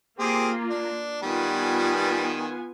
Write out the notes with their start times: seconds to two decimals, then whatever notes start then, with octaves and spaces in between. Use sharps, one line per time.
0.19 A#3 C4 F4 G4 G#4
0.70 D4
1.22 D#3 G3 B3 F4 G#5